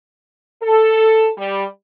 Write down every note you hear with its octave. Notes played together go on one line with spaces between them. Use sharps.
A4
G3